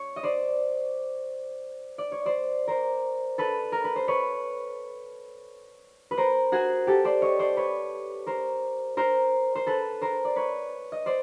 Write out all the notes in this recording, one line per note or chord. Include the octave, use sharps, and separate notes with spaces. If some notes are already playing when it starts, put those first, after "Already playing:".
Already playing: C#5
D#5
C5 D5
D5
C#5
C5 D5
A#4 C5
A4 B4
A#4
B4
C5
B4 C#5
B4
A#4 C5
F#4 G#4
G4 A4
C5 D5
C#5 D#5
C5 D5
B4 C#5
A#4 C5
A#4 C5
C5
A4 B4
A#4 C5
D5
B4 C#5
D#5
C5 D5